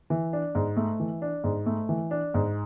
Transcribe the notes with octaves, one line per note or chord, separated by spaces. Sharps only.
E3
D4
G#2
A3
E3
D4
G#2
A3
E3
D4
G#2